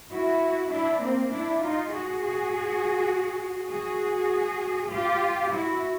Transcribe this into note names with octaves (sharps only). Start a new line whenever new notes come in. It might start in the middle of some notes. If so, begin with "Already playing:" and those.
E4 F#4
D4 E4
A#3 C4
D4 E4
D#4 F4
F#4 G#4
F#4 G#4
F#4 G#4
F4 G4
E4 F#4